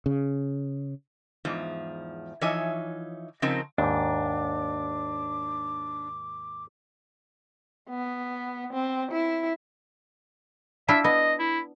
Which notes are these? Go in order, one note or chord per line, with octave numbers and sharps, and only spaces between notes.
C#3
E2 G#2 F3
E3 F3 D#4 C#5 E5 G#5
C#3 F3 C4 D#4 A#4 C5
D#2 G#2 D4 D6
B3
C4
E4
D4 E4 F4 E5
B3 D#5
E4